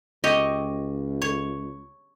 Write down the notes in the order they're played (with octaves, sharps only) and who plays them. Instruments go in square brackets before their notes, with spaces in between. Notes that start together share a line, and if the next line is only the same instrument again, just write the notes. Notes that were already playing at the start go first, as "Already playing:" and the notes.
[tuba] C#2 [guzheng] G4 C#5 [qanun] D#5
[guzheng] C#5